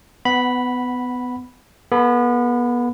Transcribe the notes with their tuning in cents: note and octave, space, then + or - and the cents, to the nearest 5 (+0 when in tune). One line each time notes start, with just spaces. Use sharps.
B3 +20 F#5 +0 B5 -5
B3 -30 A4 -5 B5 +15